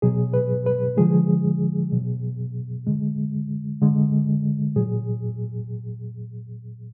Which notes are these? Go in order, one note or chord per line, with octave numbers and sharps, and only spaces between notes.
B2 F#3 G#4
B4
B4
D3 F3 G#3 G#4
B2 F#3
D3 G#3
D3 G#3
A#2 F#3 G#4